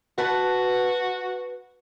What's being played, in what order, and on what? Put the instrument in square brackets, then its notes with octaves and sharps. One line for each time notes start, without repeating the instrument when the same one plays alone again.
[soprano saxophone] F#4 [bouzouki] B4 F#5 A5